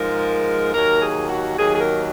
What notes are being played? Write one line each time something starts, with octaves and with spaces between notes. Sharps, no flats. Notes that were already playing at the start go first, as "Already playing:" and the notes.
Already playing: G#2 F3 G#3 A#4
D#2 D#3 F#3 A#4
G#4
F#4
D#2 D#3 F#3 G#4
G#4
A#4